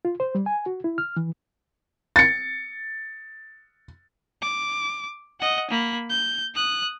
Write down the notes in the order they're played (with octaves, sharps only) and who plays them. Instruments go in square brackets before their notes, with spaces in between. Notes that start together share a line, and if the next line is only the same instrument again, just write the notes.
[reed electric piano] F4
C5
G3
G#5
F#4
E4
F6
E3
[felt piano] A6 C#7
[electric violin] D6
D#5 F#5
A#3 B5
G6
D#6 F#6